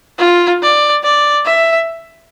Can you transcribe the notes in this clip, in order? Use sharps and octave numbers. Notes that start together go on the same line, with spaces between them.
F4
D5
D5
E5